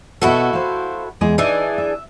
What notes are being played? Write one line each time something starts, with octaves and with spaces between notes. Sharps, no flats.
B2 B3 E4 F#4 A4
C5 F5
E2 G#3 G#4
E3 D4 D#4 G#4
E5